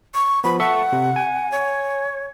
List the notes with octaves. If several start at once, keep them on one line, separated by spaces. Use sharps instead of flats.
C#6
F3 B3 B5
A4 E5 F#5 C#6
C3
G#5
C#5